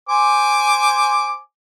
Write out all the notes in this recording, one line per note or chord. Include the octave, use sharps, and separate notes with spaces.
C5 G#5 D6